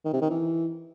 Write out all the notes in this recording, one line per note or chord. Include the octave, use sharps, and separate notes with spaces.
D#3
C3
D#3
E3